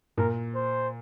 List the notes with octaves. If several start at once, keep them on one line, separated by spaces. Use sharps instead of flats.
A#2 A#4
C5